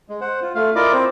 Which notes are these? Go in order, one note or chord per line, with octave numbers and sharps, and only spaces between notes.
G#3
C5 F#5
F4
A3 F4 F5
E4 F4 A#4 D5 D#5 D6
C4 C5